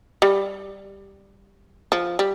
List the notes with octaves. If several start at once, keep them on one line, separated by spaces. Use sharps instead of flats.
G3
F3
G3